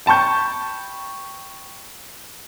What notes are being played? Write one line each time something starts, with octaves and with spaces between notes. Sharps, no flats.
G5 A5 B5 C#6 G6